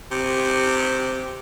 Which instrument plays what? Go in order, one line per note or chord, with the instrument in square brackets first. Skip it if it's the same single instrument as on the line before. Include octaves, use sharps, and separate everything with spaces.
[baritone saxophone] C3